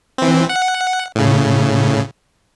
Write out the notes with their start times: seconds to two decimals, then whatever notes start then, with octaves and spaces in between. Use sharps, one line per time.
0.18 E3 C4
0.49 F#5
1.15 A2 C#3